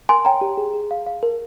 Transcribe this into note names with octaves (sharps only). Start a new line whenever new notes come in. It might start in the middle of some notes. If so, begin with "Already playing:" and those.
A#4 G#5 C6
C#5 G5 A#5
G4
G#4
G#4
F5
F5
A#4